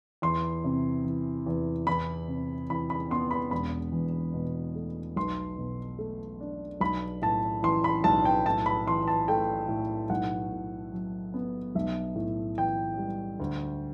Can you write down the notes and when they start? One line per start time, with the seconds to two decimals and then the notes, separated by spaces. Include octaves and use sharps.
0.22 E2 C6
0.64 C3
1.05 E3
1.46 E2
1.87 E2 B5
2.28 C3
2.70 E3 B5
2.90 B5
3.11 B3 C6
3.31 B5
3.51 E1 B5
3.92 E2
4.34 B2
4.75 A3
5.16 B1 C6
5.58 B2
5.99 A3
6.40 D4
6.81 B1 B5
7.22 A2 A5
7.63 E3 C6
7.84 B5
8.04 B1 A5
8.25 G5
8.45 A2 A5
8.66 B5
8.87 E3 C6
9.08 A5
9.28 A3 G5
9.69 A2
10.10 B1 F#5
10.52 A2
10.93 F#3
11.34 B3
11.75 B1 E5
12.16 A2
12.57 E3 G5
12.98 G3
13.40 D2